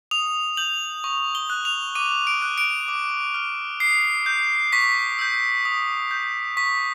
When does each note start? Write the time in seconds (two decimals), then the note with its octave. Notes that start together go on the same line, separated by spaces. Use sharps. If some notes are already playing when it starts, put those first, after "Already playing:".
0.11 D#6 F7
0.57 G6 F#7
1.04 C#6
1.35 G7
1.50 F#6
1.65 F7
1.95 D6 D#7
2.27 D7
2.42 F#6
2.58 D7
2.88 D6
3.34 F6
3.80 D#6 C7
4.26 G6
4.73 C#6 B6
5.19 E6 G6
5.65 D#6
6.11 G6
6.57 C#6 B6